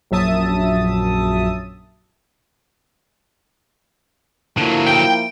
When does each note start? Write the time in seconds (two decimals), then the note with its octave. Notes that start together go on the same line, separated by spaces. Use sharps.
0.11 A#1 F#2 F#3 E5 A5 D#6
4.58 D3 F3 F#3 A#3 E4
4.87 G5 D7